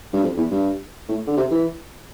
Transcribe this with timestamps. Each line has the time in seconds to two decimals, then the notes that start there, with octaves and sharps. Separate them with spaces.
0.13 G2
0.23 F2
0.37 E2
0.51 G2
1.09 A2
1.27 D3
1.37 C3
1.51 E3